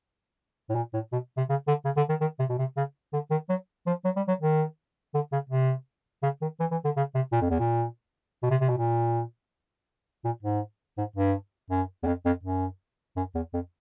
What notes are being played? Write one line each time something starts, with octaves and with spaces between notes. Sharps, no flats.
A2
A#2
A2
B2
C3
C#3
D3
C#3
D3
D#3
D#3
C3
B2
C3
C#3
D3
D#3
F#3
F3
F#3
G3
F#3
D#3
D3
C#3
C3
C#3
D#3
E3
E3
D3
C#3
C3
A#2
F2
E2
A#2
B2
C3
C3
B2
A#2
A#2
G#2
G#2
G2
F#2
E2
F2
F2
F#2
F#2
E2
F2